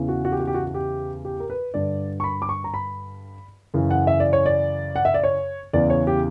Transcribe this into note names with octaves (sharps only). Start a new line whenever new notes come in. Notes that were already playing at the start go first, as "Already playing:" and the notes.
Already playing: E2 C#3 E3
F#4
F#4
G4
F#4
G4
F#4
F#4
G4
G4
A#4
B4
G2 D3 D5
C#6
B5
D6
C#6
A#5
B5
F#2 C#3 E3
F#5
E5
D5
C#5
D5
F#5
E5
D5
C#5
E2 C#3 E3 D5
C#5
G4